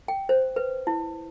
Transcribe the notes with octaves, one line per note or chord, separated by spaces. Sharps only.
G5
C5
B4
E4